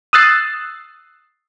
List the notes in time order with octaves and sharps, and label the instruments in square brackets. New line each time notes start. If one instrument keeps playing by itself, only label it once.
[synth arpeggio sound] D#6 E6 F#6 A6 C7